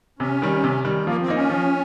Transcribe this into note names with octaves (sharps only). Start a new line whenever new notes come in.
C3 C#4
D#3 G3
C3
D#3 G3
F3 A#3
C4
A#3 D#4
C#4
F3